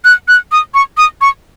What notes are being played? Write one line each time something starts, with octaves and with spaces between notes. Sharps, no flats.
F#6
F#6
D#6
C#6
D#6
C#6